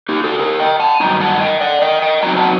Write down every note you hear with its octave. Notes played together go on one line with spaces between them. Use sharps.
D#4 G4
F#4 A4
G4 A#4
D#5 G5
F#5 A5
G2 D#3 F#3 A3 D#4 G5 A#5
F#5 A5
D#5 G5
D5 F#5
D#5 G5
D#5 G5
A2 F#3 C4 D#4 G5 A#5
F#5 A5